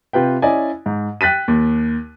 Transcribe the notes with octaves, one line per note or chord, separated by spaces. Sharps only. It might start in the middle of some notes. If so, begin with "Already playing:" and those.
C3 F4 B4 G5
C#4 E4 D5 D#5 G#5
G#2
G5 F#6 A6 B6 D#7
D#2